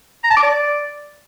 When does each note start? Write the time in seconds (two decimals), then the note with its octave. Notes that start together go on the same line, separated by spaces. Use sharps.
0.24 A#5
0.30 A5
0.37 D6
0.43 D5